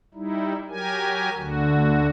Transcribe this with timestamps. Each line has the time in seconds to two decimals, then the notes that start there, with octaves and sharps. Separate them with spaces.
0.14 G3 D#4 E4
0.69 F#3 G4 A#4 G#5
1.37 D2 D3 F#4